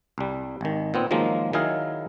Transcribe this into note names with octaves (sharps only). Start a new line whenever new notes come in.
C2 G3
G#1 D#3
A#2 B3 C4
D#3 F3 F#3 G#3 A#3
D#3 F#3 E4 G#4 F5